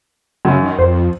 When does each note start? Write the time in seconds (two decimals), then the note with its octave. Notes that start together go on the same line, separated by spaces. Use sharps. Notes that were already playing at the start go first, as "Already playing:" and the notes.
0.45 F#2 C#3
0.62 D#3
0.79 F2 C5